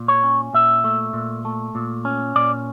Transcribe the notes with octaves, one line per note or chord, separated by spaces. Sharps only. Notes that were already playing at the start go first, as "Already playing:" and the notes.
Already playing: A#2
C#5
C#4
A#2 E5
A3
A#2
A3
A#2
C#4
A#2 D5